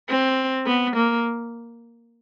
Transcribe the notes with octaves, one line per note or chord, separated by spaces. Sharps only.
C4
B3
A#3